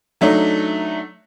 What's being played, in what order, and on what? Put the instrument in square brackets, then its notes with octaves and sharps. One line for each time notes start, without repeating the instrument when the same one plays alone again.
[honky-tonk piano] F#3 A3 D4 D#4